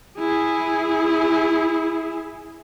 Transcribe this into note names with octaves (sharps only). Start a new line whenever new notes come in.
E4 G#4